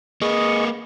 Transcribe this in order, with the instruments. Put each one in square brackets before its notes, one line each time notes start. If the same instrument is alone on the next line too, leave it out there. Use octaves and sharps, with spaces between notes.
[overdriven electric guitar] A#3 B4 [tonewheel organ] G#4 D#5 C#6